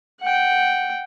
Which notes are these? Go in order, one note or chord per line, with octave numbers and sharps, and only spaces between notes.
F#5 G5